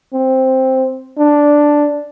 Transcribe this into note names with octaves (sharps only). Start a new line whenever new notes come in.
C4
D4